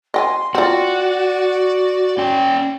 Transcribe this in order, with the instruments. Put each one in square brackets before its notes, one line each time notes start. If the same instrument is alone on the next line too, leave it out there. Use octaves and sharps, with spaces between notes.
[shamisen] D#5 G5 G#5 [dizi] C6
[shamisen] C4 F4 [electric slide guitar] F#4 [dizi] D5
[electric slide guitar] C#4 G5